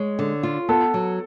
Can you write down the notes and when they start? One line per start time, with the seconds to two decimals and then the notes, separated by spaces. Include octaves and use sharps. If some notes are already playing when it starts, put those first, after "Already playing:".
Already playing: G#3 C#5
0.19 D3
0.43 F4
0.69 B3 A4
0.94 F#3